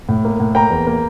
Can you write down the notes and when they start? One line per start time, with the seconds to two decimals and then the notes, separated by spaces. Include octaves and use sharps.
0.09 A2
0.25 A#3
0.40 A2
0.55 A#3 G5 A#5
0.70 E2
0.87 A#3